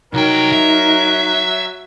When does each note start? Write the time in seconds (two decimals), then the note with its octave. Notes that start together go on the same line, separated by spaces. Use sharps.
0.14 C2 F#3 D#4 A#4 G5
0.52 E5